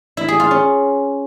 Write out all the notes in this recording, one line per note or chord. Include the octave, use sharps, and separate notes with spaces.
E4
G#4
F4
C#4